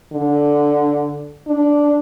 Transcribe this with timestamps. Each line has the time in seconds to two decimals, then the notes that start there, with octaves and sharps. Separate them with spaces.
0.12 D3
1.48 D4